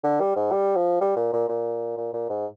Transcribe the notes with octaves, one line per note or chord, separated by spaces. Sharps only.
D3
G3
G#2
G3
F3
G3
A#2
A#2
A#2
A#2
A#2
G#2